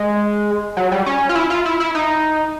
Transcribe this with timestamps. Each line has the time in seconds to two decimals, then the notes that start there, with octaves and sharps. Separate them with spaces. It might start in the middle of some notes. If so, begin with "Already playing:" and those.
Already playing: G#3
0.77 F#3
0.92 G3
1.06 C#4
1.29 F4
1.35 E4
1.50 F4
1.65 E4
1.80 E4
1.95 D#4